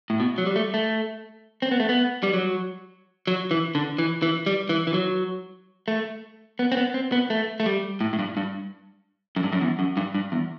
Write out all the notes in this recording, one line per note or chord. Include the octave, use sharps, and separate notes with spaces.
A2
B2
F#3
G3
A3
A3
C4
B3
A3
B3
G3
F#3
F#3
E3
D3
E3
E3
G3
E3
E3
F#3
A3
B3
C4
B3
C4
B3
A3
A3
G3
A2
A2
G2
G2
F#2
G2
F#2
E2
F#2
G2
G2
E2